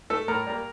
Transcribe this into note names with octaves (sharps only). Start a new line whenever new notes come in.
A3 A4
A2 A#4
G3 A#3